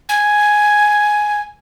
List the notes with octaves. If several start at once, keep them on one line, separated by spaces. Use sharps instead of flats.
G#5